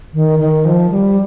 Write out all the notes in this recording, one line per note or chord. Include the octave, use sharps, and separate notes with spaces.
D#3
D#3
F3
G3